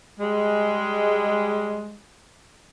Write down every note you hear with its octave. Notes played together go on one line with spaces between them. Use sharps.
G3 G#3